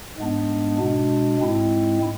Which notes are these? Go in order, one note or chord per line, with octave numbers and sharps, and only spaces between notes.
G#2 G#3 B3 D4
B2 G#3 D4
G#2 G#3 C4 E4